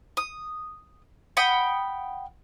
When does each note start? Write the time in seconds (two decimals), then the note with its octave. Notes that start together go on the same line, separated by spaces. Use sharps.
0.17 D#6
1.37 F#5 G5 B5 D#6